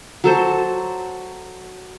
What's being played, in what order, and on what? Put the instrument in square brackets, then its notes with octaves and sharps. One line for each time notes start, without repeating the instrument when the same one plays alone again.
[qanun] F#3 A4 C5